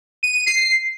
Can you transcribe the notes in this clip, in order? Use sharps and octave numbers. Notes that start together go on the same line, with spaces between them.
D#7
D#7
C7